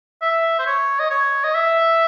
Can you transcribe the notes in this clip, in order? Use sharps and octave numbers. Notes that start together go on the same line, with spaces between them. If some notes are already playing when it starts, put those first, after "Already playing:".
E5
C5
C#5
D#5
C#5
D#5
E5